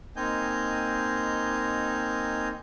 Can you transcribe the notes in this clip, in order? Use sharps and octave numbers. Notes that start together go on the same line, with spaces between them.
A#3 C4 D#4 D#5 G#5 G6